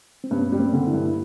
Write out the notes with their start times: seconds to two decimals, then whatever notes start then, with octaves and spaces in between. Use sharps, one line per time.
0.24 C4
0.31 G2 B3 C#4
0.52 G3
0.59 A#3 C4
0.73 D3
0.87 D4 E4
0.94 G2